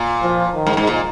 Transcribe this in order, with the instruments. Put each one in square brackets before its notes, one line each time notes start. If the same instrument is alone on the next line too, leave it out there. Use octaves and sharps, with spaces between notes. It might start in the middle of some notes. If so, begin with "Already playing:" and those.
Already playing: [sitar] A#2
[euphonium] F3
D#3
[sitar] G#2
G#2
A#2